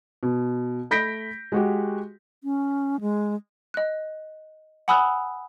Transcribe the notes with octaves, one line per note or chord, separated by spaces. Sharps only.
B2
A3 B5 G6 A#6 B6 D7
G#3 F#4 G4
C#4
G#3
D#5 F#6
F#5 G#5 B5 D#6 E6 F#6